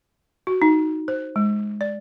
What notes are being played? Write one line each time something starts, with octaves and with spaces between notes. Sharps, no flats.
F#4
D#4
C5
G#3
D5